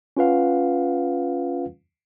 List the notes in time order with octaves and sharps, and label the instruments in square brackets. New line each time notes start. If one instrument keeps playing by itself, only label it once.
[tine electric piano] C#4 F4 B4 F5 F#5